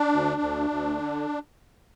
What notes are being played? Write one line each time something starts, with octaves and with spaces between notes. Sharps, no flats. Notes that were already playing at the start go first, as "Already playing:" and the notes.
Already playing: D4
D2
D2
D2
D3